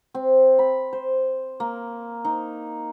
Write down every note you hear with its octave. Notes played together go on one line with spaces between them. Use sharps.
C4
B5
C5
A#3
D#4